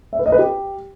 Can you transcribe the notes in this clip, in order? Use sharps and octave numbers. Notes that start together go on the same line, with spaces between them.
E5
B4
D#5
B4
G4